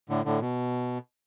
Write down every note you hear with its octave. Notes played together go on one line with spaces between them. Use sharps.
A2 D3
A2 D3
B2